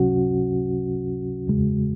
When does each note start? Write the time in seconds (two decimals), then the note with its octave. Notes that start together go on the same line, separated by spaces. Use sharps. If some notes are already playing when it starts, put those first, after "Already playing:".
Already playing: C#2 C3 F#3 C#4 F#4
1.48 E2 C#3 G#3